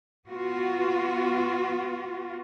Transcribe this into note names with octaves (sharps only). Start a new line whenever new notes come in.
B3 F4 F#4